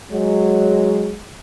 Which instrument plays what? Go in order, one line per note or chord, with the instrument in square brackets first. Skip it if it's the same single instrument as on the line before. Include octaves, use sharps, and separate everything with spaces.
[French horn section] F#3 G#3